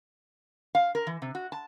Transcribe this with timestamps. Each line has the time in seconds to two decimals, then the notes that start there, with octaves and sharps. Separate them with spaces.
0.75 F5
0.95 A#4
1.07 E3
1.22 C3
1.35 F#4
1.52 A5